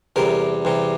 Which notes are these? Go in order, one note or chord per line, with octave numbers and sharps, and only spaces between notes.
E2 C3 G3 A#4
E2 C3 G3